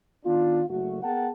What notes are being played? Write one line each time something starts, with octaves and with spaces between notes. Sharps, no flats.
D#3 B3 D4 F4
F#1 A3 F#4
B3 G#4 A#4 F#5 G5 A5